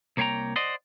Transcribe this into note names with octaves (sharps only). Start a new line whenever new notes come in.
C2 A#3 C#5 F5 G5 A#5
C5 D5 D#5 F#5